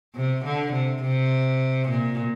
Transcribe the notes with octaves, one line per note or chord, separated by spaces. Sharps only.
C3
D3
C3
C3
A#2